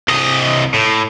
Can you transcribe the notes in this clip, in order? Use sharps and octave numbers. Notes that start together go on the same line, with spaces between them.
C2 D#5
A2